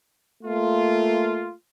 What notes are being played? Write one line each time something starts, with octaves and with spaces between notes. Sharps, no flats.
A3 A#3 F4